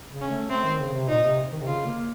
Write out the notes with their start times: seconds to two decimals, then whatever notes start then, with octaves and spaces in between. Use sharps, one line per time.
0.11 C#3
0.21 C#4
0.31 A3
0.50 A3 C4
0.64 D#3
0.80 C#3
0.94 C3
1.08 A#2 D#4
1.24 C3
1.52 D#3
1.61 C3
1.67 C#3 F4
1.86 A#3